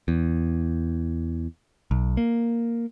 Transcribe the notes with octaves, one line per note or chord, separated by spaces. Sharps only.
E2
B1
A#3